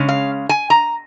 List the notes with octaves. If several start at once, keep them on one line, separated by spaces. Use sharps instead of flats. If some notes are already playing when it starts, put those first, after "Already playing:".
Already playing: C#3 G#3 C#4
F5
G#5
A#5